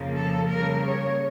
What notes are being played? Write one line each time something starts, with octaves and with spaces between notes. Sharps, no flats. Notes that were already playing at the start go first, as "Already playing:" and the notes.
Already playing: F2 C#3 F3 A#3
A4
C#3 G3 A#3 A#4
C#5